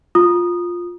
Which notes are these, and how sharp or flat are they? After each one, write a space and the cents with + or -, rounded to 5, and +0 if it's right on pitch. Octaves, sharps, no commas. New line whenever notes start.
F4 +5 D#6 -15